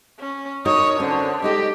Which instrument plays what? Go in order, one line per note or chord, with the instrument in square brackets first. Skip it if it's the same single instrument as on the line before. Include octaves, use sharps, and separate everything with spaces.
[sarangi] C#4
[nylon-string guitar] D#4 F#4 A#4 [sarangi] C#5 [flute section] D#6
[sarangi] D3 [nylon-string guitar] C#4 [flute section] F#4 C5
[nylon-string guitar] G#3 D#4 A4 [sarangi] G4 [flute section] D#5